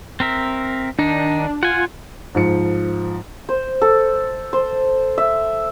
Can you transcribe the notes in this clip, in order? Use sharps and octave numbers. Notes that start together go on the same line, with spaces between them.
C4 A#4 E5
D#3 D4 D#4
F4 F#5 G#5
G#2 F3 C#7
C5
A4
C5
E5